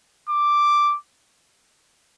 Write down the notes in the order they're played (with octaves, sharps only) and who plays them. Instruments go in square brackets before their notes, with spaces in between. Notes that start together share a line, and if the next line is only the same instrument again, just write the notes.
[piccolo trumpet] D6